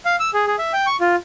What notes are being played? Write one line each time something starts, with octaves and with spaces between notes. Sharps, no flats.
F5
E6
G#4
G#4
E5
G5
C#6
F4